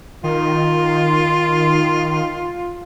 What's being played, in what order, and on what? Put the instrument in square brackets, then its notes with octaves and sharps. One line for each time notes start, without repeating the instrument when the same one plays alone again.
[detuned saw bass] D#3 [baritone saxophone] F4